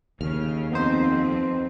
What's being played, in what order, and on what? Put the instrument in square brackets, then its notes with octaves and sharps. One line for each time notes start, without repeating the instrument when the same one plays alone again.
[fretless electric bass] D#2 [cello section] C#3 [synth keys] F6
[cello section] F2 C4 [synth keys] B3 D#4 C5